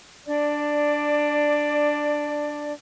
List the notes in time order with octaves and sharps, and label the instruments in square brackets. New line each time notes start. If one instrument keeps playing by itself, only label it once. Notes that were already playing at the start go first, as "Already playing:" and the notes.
[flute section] D4 D5